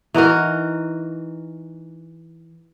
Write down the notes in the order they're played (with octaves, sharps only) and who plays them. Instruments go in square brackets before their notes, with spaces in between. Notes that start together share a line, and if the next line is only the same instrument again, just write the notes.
[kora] E3 D#4 F#4 A#4